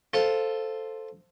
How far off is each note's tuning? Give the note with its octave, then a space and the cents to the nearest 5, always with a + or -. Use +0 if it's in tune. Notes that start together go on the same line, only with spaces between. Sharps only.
F4 +0 A4 +5 C5 +0